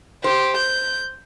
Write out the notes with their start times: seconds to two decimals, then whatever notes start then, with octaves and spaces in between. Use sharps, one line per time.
0.24 G4 C5
0.57 G6